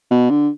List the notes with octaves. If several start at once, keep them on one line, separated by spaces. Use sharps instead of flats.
B2
D3